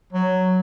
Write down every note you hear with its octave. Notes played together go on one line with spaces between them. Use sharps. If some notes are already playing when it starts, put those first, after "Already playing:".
F#3